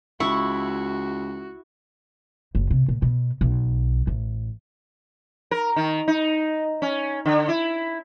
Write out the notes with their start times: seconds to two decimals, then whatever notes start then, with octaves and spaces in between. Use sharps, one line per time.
0.20 C#2 E4 F#4 C#6
2.55 F#1
2.70 C3
2.89 A#2
3.02 B2
3.41 B1
4.07 A1
5.51 A#4
5.76 D#3
6.08 D#4
6.82 C#4
7.25 D3
7.49 E4